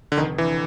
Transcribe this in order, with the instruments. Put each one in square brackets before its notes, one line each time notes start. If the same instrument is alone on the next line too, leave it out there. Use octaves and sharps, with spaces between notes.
[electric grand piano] D3
[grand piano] F1 [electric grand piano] D#3
[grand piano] D3 [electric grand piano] E3